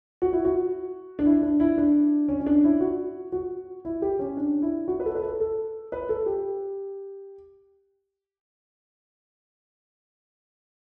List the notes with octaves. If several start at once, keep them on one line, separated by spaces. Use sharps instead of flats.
F#4
E4
F#4
D4
E4
D4
E4
D4
C#4
C#4
D4
E4
F#4
F#4
E4
G4
C#4
D4
E4
F#4
B4
A4
B4
A4
A4
B4
A4
G4